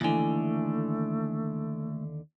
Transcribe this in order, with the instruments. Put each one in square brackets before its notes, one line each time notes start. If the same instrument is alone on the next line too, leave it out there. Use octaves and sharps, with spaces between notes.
[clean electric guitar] D#2 D3 [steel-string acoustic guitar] E3 G#5 [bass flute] A3